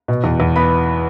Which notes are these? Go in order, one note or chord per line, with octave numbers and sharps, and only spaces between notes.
B2
E2
E2
B3 B5